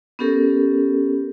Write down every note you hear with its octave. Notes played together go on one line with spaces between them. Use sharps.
B3 C#4 G4 A4 A#4